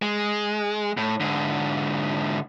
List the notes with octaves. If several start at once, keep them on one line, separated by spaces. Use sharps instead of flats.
G#3
A2
G#2 D3